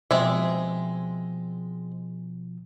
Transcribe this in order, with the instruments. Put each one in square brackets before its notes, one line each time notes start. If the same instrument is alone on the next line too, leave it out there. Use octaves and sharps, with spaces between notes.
[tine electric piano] B2 F3 [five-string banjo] G#3 C4 E5